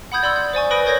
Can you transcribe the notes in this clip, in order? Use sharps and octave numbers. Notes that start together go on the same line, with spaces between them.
F#5 B5 D#6 G6 G#6
D5 B5 C6 E6
G6
C5 D5 G#5 C#6
B4 B5 D#6 A#6 D7
A#4 C#5 G6 G#6 A#6